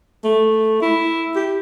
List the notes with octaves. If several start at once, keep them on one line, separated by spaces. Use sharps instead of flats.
A3
E4
G4